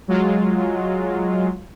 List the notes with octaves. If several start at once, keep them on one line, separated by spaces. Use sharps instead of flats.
F#3 G#3 F4